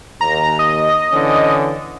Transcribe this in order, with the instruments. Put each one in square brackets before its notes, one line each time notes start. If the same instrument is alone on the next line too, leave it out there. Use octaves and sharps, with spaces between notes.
[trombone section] D#2 [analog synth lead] A#5
[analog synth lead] D#5
[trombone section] D3 E3 C#4